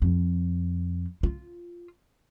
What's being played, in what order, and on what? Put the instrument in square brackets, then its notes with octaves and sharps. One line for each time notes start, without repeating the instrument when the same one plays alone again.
[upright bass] F2
F4